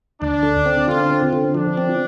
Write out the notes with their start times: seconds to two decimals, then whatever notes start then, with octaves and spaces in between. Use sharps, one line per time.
0.21 D2 D4
0.43 D3
0.66 C4
0.87 D3 F4
1.10 C4
1.33 D3
1.54 F3 D4
1.77 C4